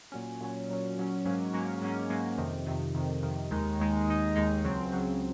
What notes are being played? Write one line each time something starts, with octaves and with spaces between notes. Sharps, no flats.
A#2 F#3 C#4
A#2 F#3 C#4
A#2 F#3 C#4
A#2 F#3 C#4
G#2 F#3 A#3 C#4
G#2 F#3 A#3 C#4
G#2 F#3 A#3 C#4
G#2 F#3 A#3 C#4
F2 C3 D#3
F2 C3 D#3
F2 C3 D#3
F2 C3 D#3
D#2 D#3 G#3 D#4
D#2 D#3 G#3 D#4
D#2 D#3 G#3 D#4
D#2 D#3 G#3 D#4
C#2 C#3 F#3 C4
C#2 C#3 F#3 C4